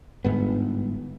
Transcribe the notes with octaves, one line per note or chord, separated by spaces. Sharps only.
G1 G#2 B3